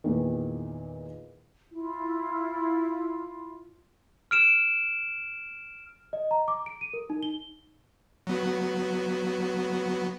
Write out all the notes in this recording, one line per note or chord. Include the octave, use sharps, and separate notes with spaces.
E2 A#2 D#3
E4 F4
F6 D7 E7
D#5
A#5
D6
D7
D#7
A#4
D#4
G7
F#3 B3 F#4